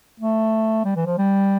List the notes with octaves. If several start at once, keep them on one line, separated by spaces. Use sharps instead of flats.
A3
G3
E3
F3
G3